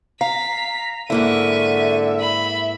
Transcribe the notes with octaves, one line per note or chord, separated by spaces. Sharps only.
F5 A#5 B6
G#2 D3 A#3 E4 E5 C#6 D#7
B5